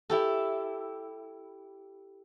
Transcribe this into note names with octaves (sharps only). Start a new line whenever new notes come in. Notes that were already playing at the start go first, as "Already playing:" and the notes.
E4 G4 A4